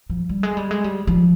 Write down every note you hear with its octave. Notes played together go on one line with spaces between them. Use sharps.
F3
G3
G#3
G3
G#3
G3
F3